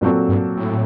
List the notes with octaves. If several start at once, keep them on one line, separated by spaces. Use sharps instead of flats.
G2 A#2 F#3 C4 F#4 A4
G2
A2